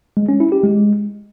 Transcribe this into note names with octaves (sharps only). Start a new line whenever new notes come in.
G#3
C#4
E4
G4
G#3